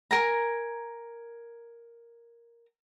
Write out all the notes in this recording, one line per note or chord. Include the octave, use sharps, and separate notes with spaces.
A#4 G#5 A#5